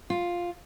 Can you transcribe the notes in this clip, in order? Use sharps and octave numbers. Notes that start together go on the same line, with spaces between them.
F4